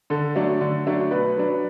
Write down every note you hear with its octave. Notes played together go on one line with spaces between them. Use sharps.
D3 A4
F#3 A3 D4
D3
F#3 A3 D4
B2 B4
F#3 D4